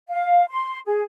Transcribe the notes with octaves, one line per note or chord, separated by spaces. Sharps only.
F5
C6
G#4